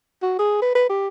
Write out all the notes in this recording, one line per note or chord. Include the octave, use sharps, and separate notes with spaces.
F#4
G#4
B4
B4
G4